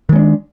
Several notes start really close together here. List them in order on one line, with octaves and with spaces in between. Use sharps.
D#3 G#3 C#4 D4